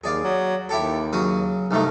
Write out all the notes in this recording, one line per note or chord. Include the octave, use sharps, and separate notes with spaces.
D#2 G#4 D5 F5
F#3
D#2 E4 G4 A4
C#3 F#3 D#6
C2 G2 A3 D#4